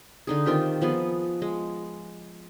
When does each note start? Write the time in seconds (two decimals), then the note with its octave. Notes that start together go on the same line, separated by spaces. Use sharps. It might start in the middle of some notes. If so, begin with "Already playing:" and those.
0.27 D3 D#4 G#4
0.46 D#3 C4 F4 G4
0.81 F3 B3 G#4
1.42 G#3